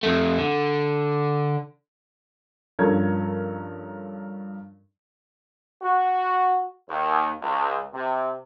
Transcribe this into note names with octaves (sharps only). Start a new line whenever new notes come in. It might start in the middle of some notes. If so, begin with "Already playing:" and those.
F2 A3
D3
G2 F3 C#4 A4 A#4 G#6
F#4
D#2
C#2
C3